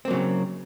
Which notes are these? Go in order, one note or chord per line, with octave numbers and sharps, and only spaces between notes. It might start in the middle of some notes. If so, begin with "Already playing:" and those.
C#3 F#3 A#3 C4